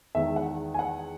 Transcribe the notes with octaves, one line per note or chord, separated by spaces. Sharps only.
E2 D#3 G#3 E5
F#5
G#5
F#5